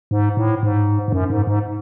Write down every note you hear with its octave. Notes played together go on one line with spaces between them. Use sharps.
G#2
A2
G#2
G#2
F#2
G#2
G#2